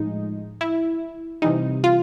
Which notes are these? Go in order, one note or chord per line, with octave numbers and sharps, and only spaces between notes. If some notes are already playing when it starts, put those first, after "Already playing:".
Already playing: A2 F3 G#3 D#4
E4
C3 E3 G3 D#4
F4